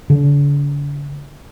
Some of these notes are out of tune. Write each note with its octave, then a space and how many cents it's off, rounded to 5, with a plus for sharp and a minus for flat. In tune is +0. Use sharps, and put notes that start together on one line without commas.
D3 -40